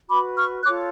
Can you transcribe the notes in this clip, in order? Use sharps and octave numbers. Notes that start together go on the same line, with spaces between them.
F#4 B4 B5 D6
C#6 F6
F4 A4 C#5 D6 F#6